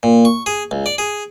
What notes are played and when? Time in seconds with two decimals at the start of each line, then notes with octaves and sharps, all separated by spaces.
0.03 A#2
0.25 C#6
0.46 G#4
0.71 C#2
0.86 D5
0.98 G#4